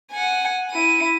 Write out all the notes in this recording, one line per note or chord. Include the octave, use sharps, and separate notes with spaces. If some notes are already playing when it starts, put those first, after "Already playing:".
F#5 G#5
E4 D#7